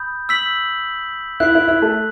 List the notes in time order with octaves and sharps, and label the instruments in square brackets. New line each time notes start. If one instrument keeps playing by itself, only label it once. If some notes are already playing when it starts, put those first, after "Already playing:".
Already playing: [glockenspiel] B5 D#6 G6
E6 B6 F#7
[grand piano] E4 [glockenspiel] F#6 C7 F#7
[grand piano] E4
E4
A3 A4